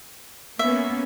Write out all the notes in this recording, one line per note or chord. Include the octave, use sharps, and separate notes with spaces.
A#3 B3 C#4 E5